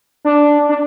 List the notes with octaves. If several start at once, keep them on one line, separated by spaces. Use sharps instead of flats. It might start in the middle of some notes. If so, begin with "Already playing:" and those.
D4
D4